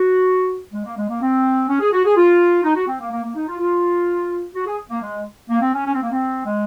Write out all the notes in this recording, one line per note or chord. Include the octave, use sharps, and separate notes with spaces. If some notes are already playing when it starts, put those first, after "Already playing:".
Already playing: F#4
G#3
A#3
G#3
A#3
C4
C#4
G#4
F#4
G#4
F4
D#4
F#4
C4
A#3
A#3
A#3
D#4
F4
F4
F#4
G#4
A#3
G#3
A#3
C4
C#4
C#4
C4
A#3
C4
G#3